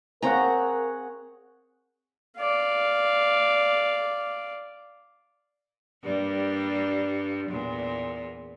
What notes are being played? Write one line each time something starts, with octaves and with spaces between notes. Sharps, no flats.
C4 G#4 A#4 C#5 F#5 A#5
D5 F5
G2 G3 A#3
E2 A#2